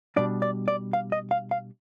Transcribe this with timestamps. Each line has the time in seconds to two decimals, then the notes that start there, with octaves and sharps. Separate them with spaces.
0.16 B2 G3 D4 D5
0.42 D5
0.68 D5
0.93 F5
1.12 D#5
1.31 F5
1.51 F5